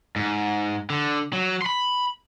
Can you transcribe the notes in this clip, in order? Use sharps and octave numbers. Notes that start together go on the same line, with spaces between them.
G#2
D3
F#3
B5 C6